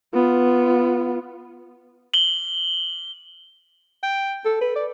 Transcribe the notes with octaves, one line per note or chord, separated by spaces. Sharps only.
B3 F4
F#7 G7
G5
A4
B4
D5